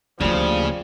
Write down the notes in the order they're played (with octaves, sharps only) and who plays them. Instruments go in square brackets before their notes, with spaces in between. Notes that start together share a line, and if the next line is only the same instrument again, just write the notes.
[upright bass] D2 A#3 [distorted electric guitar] C#3 [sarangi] F3 [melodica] G3